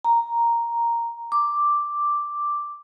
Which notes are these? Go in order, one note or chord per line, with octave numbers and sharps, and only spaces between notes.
A#5
D6